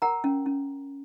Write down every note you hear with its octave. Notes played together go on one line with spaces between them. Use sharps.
A#4 F#5 A#5
C#4
C#4